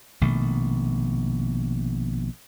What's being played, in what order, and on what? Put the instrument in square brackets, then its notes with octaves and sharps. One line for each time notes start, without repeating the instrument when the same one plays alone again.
[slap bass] A#1 B2 D#3 A3